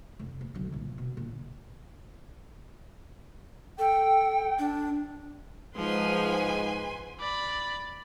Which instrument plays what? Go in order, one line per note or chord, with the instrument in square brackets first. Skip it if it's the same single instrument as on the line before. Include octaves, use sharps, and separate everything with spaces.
[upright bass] F1
A#2
B1 D3
C2 A#2
B2
A#2 D3
[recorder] A4 [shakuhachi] G5
[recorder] D4
[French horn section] G#2 [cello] F3 [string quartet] B4 G#5 C6
[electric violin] D5 B5